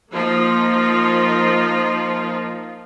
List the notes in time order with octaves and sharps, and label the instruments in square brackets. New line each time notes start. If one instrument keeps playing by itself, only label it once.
[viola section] F3 A#3 D#4 F4